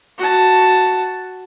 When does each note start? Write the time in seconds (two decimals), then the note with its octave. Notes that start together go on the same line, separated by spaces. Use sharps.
0.18 F#4 A5